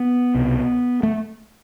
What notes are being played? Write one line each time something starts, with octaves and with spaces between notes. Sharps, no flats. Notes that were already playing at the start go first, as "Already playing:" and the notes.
Already playing: B3
C2 B2
A3